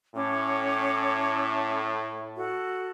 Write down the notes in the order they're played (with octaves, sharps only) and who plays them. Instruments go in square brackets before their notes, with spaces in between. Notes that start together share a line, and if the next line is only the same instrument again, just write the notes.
[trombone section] A2 [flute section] C#4 C#5 D6
[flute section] F#4 A4